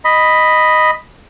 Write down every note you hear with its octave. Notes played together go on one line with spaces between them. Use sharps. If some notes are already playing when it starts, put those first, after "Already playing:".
D#5 B5